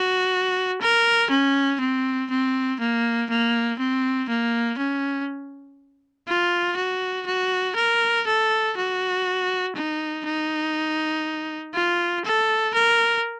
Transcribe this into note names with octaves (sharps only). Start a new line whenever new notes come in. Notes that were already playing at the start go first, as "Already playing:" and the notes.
Already playing: F#4
A#4
C#4
C4
C4
A#3
A#3
C4
A#3
C#4
F4
F#4
F#4
A#4
A4
F#4
D#4
D#4
F4
A4
A#4